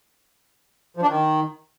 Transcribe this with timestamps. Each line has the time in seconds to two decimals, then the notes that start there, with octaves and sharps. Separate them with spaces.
0.97 F3
1.03 D4
1.08 D#3